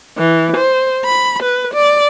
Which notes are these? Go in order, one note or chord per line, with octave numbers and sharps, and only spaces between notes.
E3
C5
B5
B4
D5